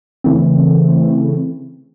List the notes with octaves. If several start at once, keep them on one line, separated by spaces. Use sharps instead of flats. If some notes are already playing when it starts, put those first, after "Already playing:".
C#3 E3 A3 C4